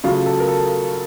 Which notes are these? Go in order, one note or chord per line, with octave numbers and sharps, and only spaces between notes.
C#3 F#3 A3 F4
A4
A#4
A4